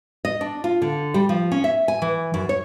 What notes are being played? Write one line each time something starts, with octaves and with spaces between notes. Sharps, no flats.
D#5
D4
F4
D3
G3
F3
C#4
E5
G#5
E3
F#2
C#5